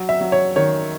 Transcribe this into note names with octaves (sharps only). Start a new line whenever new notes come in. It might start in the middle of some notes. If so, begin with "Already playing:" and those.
Already playing: F#3
E5
F#3
C#5
D#3 C#5